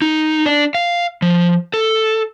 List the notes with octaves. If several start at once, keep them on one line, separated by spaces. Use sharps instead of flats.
D#4
D4
F5
F3
A4